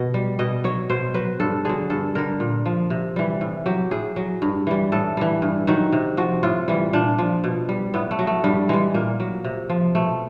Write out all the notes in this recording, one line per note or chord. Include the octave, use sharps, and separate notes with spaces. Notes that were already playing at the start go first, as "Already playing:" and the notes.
Already playing: B2 D#5
G3
B2 D#5
F#3 C#5
B2 C5
F#3 B4
G2 A4
D3 F#3 G#4
G2 A4
D3 G3 A#4
A#2
F3
C3
E3 G3
A2
F#3 G4
A2 G#4
F#3
G2
E3 G3
A2 A4
E3 G3
G2
D#3 F#3
C3
F3 F#4
A2 F4
E3 G3
A#2 D4
F3
B2
G3
A2 B3
A3
F#3
A3
G2 G3
E3 G3 G#3
A#2 A#3
F#3
C3
F3
B2 A3